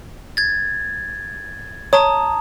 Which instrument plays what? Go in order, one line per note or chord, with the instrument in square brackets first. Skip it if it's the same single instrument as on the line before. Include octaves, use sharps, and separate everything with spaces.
[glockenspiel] G#6 A6
[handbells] C#5 [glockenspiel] A5 A#5 D#6